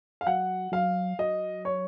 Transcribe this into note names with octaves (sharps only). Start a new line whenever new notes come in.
F5
F#3 F#5
F#3 F5
F#3 D#5
C#5